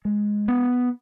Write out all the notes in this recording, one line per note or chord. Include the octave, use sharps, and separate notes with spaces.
G#3
B3